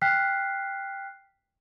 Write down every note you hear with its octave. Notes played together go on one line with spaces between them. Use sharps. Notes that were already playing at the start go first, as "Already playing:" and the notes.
G5 F6 F#6 B6 C7